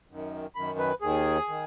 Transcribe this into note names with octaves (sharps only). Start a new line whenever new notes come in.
F#2 D#3
F#2 D#3 B5
B4
D#2 D#3 G#4
D#3